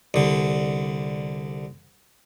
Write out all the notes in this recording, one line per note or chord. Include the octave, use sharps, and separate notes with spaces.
C2 D3